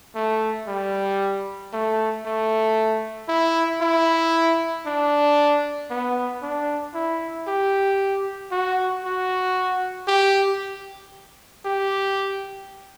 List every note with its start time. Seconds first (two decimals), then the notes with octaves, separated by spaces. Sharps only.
0.15 A3
0.68 G3
1.73 A3
2.25 A3
3.29 E4
3.81 E4
4.86 D4
5.90 B3
6.42 D4
6.94 E4
7.48 G4
8.52 F#4
9.04 F#4
10.08 G4
11.65 G4